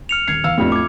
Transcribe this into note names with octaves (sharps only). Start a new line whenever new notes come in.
F6 C#7 F7
D#1 G#6 C7 C#7
E2 F5 E6
F2 A2 B3 D4 G4
F3 D6 G#6